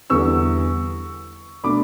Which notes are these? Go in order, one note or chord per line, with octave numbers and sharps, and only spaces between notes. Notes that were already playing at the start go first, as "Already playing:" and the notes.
E2 D3 G3 B3 C#6 E6
B2 A3 D4 B5 D6